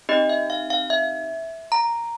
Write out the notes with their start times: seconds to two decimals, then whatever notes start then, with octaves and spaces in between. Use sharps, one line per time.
0.09 C4 D#4 G4 D#5
0.29 E5
0.50 F5
0.70 F5
0.90 E5
1.72 A#5